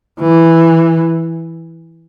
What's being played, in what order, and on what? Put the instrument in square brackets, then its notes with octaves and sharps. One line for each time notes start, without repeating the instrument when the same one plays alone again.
[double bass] E3